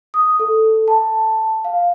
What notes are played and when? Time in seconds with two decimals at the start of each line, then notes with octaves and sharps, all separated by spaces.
0.14 D#6
0.39 A4
0.88 A5
1.64 F5